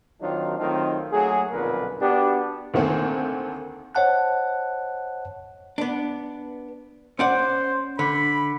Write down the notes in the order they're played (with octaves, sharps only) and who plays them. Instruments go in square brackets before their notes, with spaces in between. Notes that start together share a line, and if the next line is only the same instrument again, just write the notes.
[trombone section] D#3 F#3 C4 D4 D#4 F4
D#3 F#3 A3 C4 D#4 F4
F#3 A3 A#3 G#4
B1 F2 A#2 D3 A#4 B4
B3 D4 F#4 G4
[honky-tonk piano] D2 D#3 A#3 C4 A4
[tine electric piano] C5 C#5 D#5 F#5 A5 F#6
[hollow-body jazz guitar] B3 D4
[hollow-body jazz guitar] C#4 D5 F#5 [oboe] C5
[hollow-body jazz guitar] D3 [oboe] B5